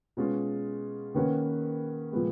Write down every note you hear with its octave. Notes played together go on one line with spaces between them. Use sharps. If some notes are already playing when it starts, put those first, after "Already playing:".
B2 G#3 C#4 F4
D#3 A#3 C#4 F#4 B4
A#2 F3 G#3 B3